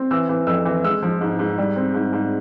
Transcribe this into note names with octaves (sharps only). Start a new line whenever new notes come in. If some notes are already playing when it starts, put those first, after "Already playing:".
Already playing: C4
E3 E6
E3
F2 E6
E3
G#3 E6
F3
G#2
G#2
G3
C4
G#2
G#2